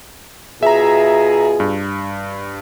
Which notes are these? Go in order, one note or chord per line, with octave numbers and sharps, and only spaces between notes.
B2 F4 G#4 E5 A#5
G2